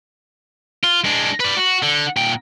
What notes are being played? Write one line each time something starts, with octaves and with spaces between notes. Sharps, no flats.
F4
G#3 D4
B4 D5
F#4
D3
A#2 G5